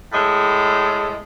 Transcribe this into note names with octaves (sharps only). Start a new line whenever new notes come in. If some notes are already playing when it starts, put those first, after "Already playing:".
A2 G#3